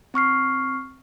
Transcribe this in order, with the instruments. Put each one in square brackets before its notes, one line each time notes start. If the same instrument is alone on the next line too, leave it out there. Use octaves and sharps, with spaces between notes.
[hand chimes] C4 C#6 F6 C7